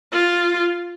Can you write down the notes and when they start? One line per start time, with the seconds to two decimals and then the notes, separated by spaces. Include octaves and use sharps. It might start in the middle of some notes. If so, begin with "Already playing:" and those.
0.12 F4